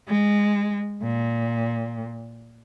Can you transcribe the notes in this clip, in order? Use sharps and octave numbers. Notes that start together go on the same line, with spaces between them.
G#3
A#2